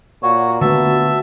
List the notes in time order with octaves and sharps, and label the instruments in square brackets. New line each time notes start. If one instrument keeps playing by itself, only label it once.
[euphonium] A#2 [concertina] F#4 C#5
[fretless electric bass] D3 A3 [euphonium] B3 [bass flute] F#4 [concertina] E5 A5